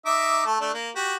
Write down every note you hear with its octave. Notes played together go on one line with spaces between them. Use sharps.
D#4 E5 D6
A3 A5
A3 D4
A#3
F#4 G4